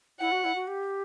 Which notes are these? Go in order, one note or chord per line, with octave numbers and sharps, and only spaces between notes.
E4 F#5
F#4
E4
F#4
G4